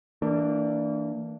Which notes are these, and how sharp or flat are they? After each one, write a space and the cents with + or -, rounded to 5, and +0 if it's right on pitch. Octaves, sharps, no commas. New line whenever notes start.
E3 -30 A#3 -30 D4 +0